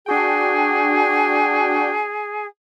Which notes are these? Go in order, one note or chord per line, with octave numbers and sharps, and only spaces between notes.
D4 F#4 G#4 G5